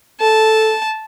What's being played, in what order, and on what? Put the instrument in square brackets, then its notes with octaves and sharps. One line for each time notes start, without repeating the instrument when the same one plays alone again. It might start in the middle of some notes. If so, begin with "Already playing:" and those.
[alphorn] A4 [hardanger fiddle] A5